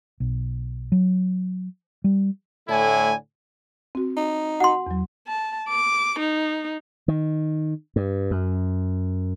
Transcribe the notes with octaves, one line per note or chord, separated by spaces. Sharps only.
B1
F#3
G3
A2 D3 A3 E4 G#5
C4 F#4
D#4
F#4 F#5 C6
E2 F#3
A5
D6
D#4
D#3
G2
F#2